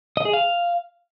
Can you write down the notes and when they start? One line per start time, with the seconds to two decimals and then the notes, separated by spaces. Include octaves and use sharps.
0.17 D#5
0.25 G#4
0.33 F5